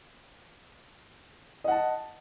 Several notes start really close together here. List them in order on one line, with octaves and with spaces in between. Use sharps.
D#5 F#5 A5